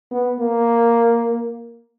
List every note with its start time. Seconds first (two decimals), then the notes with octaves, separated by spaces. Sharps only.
0.11 B3
0.39 A#3